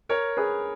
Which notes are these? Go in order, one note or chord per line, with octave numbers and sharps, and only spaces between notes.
A#4 C#5
G#4 B4